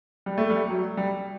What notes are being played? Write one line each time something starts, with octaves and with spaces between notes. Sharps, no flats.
G3
A3
G3
F#3
G3